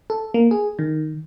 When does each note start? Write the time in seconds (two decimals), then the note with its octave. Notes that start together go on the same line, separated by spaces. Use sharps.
0.10 A4
0.34 A#3
0.51 G#4
0.79 D#3